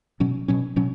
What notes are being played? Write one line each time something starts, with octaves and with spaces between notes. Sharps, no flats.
B2 F#3 C#4
B2 F#3 C#4
B2 F#3 C#4